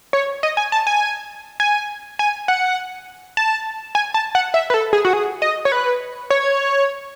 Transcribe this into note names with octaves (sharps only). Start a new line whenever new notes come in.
C#5
D#5
G#5
A5
G#5
G#5
G#5
F#5
A5
G#5
A5
F#5
E5
B4
A4
G#4
F#4
G#4
D#5
C#5
B4
C#5